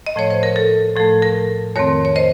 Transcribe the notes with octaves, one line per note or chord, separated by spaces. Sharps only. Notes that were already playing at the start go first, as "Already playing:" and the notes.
D#5
A2 F3 A3 C#5
C5
A#4
A4
A2 F3 A3 A4
A#4
F2 D#3 A3 C4 A#4 C#5
C#5
C5 D#5